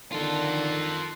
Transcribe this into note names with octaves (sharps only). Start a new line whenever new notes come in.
D3 D#3 F4 A4